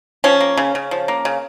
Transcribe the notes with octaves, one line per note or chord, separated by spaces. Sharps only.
F3 C#4
A#3
C#3
C#3
F3
A#3
C#3